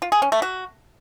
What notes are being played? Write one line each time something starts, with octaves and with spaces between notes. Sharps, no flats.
F4
G#4
C#4
A3
F#4